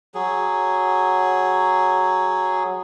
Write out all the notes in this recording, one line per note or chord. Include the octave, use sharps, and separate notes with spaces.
F#3 G#4